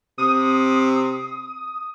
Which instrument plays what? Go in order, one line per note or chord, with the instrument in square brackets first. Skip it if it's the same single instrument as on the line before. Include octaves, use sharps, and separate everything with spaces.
[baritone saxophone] C3 [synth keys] D#6